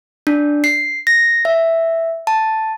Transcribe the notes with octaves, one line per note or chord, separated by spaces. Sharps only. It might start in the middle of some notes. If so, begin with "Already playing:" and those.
D4
C7
A#6
E5
A5